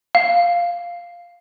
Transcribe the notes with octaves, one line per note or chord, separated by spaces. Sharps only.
F5